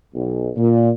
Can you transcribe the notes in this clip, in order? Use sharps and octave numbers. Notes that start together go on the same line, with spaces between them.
B1
A#2